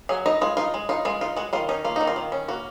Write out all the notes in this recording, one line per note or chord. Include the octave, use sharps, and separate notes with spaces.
F#3 G#4
D#4 D#5
G#3 F4
D#4 F4
G#3
D#4 F4
G#3 F4
D#4 F4
G#3 F#4
D#3 F4
C#4 D#4
A#3 F4
D#3 D#4
F4
D#3
C#4
A#3 F#4